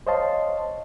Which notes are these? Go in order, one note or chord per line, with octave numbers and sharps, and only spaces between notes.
C5 C#5 D#5 F5 A5 C6